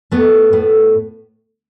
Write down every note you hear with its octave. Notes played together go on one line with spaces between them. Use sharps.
A2 A3 B3
A2 A3